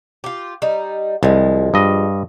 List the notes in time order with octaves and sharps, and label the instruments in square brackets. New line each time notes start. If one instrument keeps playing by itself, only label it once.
[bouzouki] F4 G4
G3 D#4
[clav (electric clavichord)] C2 [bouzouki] F3 G#3
[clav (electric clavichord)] G2 D#5